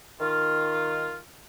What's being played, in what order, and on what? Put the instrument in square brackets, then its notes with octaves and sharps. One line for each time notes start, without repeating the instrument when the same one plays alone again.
[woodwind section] D#3 F4